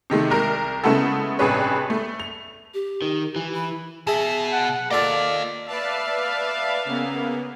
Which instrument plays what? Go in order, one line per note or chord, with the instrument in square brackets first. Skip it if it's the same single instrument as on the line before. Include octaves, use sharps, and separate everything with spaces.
[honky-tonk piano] C3 D#3 G#3 A3
C2 A#4
C#3 G#3 A3 B3 E4 A4
A1 G2 C3 G#4 B4 C#5
A3
F7
[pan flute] G4
[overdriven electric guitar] D#3
E3
[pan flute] B5
[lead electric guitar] B2 [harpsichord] G#4 E5
[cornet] F#5
[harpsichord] A#3 F4 A4 [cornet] D5 [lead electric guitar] D#5 F5
[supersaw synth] B4 D5 A5 [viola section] E5 F5
[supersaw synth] C#3 A#3 B3